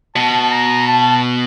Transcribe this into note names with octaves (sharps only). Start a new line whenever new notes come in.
B2 A5
A#5
A5